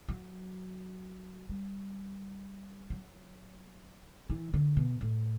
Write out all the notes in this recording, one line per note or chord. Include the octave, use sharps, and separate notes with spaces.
F#3
G3
F#3
E3
D3
B2
A2